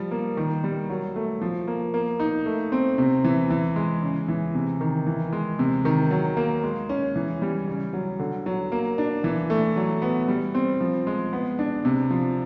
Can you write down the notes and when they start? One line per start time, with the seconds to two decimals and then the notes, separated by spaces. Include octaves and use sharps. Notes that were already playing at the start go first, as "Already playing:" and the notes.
Already playing: F3 G3
0.11 A#3
0.37 D#3
0.64 G3
0.90 F#3
1.16 A3
1.41 F3
1.67 A#3
1.94 A#3
2.20 D#4
2.46 A3
2.72 C4
2.98 C3
3.24 E3
3.50 E3
3.76 G#3
4.03 C#3
4.28 E3
4.55 C3
4.81 D#3
5.06 E3
5.33 G#3
5.59 C3
5.85 D#3
6.11 F#3
6.37 A#3
6.63 G#3
6.89 C#4
7.16 E3
7.42 G3
7.68 C#3
7.93 F#3
8.19 D3
8.46 F#3
8.72 A#3
8.98 D4
9.24 E3
9.50 A3
9.76 F#3
10.02 B3
10.28 G3
10.54 C4
10.80 F3
11.07 G#3
11.33 B3
11.59 D4
11.85 C3
12.11 F3